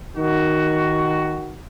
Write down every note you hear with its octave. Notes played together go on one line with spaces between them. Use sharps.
D#3 F#4